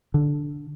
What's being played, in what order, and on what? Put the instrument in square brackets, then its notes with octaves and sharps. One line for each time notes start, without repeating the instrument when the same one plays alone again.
[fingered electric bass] D3